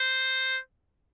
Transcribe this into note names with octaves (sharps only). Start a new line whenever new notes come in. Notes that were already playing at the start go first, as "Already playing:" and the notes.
Already playing: C5